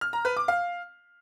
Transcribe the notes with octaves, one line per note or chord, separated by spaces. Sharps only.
F6
A#5
B4
D6
F5